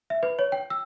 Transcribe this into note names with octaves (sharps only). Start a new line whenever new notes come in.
E5
B4
C#5
G5
E6